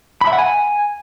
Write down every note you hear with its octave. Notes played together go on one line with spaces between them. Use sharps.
B5
E5
F#5
G#5